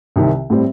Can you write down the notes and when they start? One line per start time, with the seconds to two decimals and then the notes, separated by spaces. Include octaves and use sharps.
0.16 C2 C3 D#3
0.50 A2 G3 C4